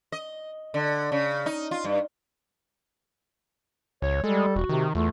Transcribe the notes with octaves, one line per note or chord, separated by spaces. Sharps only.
D#5
D3
C#3
D#4
F4
G2
C#2 C#5
G3 G#3 A4
E1 F#4
C3 D#3
E2 A3 F4